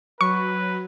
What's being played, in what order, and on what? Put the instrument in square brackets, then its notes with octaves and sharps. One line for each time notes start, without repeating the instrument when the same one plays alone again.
[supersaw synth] F#3 [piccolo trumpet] B4 [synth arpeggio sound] C#6